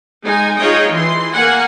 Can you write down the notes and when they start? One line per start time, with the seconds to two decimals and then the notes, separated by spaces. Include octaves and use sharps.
0.24 G#3 D#4 G#5
0.58 D#4 F4 G#4 C#5 D#5 G5
0.92 E3 C6
1.33 A#3 F#5 G#5